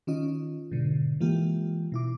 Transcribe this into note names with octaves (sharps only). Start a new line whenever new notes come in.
D#3 C#4 F4 D#5
G#2 B2 D3
E3 G#3 A#3 F4 G4
B2 E4 D6